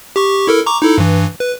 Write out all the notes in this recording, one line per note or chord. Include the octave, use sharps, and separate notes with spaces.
G4 C#6
E4 A4 A#4
A#5 C#6 D6
D#4 E4 A4
G2 E3
B4